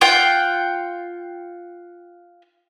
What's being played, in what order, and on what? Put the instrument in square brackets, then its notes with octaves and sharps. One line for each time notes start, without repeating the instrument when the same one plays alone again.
[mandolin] F4 F#5 G5